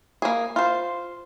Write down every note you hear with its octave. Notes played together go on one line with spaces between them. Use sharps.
A#3 G#4
F4 C5